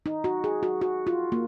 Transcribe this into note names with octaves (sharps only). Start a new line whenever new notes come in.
D#4
F#4
G#4
F#4
F#4
F4
A#3